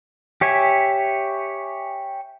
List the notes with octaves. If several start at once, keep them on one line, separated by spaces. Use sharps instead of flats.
G4 C#5 E5 G#5